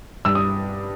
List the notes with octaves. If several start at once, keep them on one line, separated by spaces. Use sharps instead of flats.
G2 E6
D#6